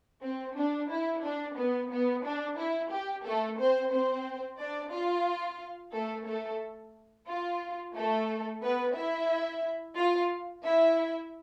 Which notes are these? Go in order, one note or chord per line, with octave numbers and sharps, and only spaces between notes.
C4
D4
E4
D4
B3
B3
D4
E4
G4
A3 A4
C4 C5
C4 C5
D4 D5
F4 F5
A3 A4
A3 A4
F4
A3 A4
B3 B4
E4 E5
F4 F5
E4 E5